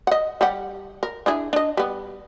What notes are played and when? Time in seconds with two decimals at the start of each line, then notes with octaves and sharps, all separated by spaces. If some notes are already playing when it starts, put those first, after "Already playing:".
0.07 D#5 F#5
0.41 G3 G4 F#5
1.03 A#4
1.26 D4 E4 G#4
1.53 D4 D#5
1.77 G3 B3